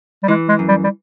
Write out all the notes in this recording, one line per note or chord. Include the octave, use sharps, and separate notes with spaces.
G3
E3 G#3
G#3
F#2
G3
G3